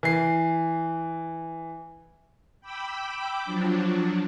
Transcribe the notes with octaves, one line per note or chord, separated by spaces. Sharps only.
E3 C7
G5 B5 D6 E6
F3 F#3 D4